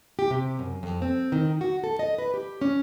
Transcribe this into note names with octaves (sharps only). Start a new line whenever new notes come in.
G4
C3
F#2
F2
C4
D#3
F#4
A4
D#5
B4
G4
C#4